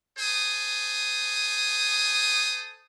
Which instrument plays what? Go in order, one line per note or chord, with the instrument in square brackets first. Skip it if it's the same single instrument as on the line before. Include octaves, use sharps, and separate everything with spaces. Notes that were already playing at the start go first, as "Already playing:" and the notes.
[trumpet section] A4 C5 G#5 D#6